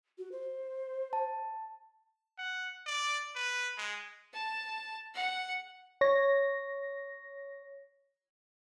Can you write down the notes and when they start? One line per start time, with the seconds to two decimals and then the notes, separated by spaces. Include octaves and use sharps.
0.18 F#4
0.32 C5
1.13 A5
2.38 F#5
2.87 D5
3.36 B4
3.78 G#3
4.33 A5
5.14 F#5
6.01 C#5 A#6